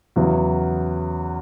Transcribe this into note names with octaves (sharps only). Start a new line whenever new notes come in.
E2 C#3 F#3 B3 E4